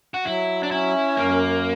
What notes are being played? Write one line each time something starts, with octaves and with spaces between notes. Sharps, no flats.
F#4
F#3 E4
D4
C#4 E4
F#2 A#3